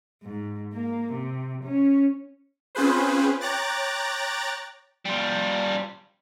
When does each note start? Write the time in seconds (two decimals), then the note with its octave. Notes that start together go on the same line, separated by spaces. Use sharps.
0.23 G#2
0.73 A#3
1.13 C3
1.65 C#4
2.75 C4 C#4 F4 G#4 B4 C5
3.41 C#5 G5 A#5 D6 F#6 A6
5.05 G3 F4